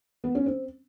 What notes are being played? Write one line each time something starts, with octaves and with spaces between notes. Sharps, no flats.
B3
C#4
C4